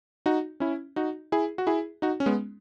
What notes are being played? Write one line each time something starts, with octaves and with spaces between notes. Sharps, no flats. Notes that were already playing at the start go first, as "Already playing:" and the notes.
D#4 F#4
C#4 E4
D#4 F#4
E4 G#4
F#4
E4 G#4
D#4 F#4
C#4
G#3 B3